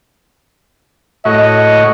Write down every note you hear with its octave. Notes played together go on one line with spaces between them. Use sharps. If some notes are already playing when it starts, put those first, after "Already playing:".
A2 F#4 C#5 D#5